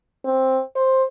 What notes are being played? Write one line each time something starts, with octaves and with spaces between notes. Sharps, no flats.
C4
C5